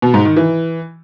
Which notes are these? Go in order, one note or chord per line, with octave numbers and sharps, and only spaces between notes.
B2
G#2
D#3
E3